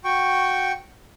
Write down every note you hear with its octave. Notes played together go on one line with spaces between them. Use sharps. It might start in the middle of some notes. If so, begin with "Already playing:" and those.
F#4 G5 C#6